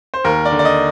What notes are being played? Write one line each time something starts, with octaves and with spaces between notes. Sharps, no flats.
C5
D#2 A#4
D5
D3
D5
D#5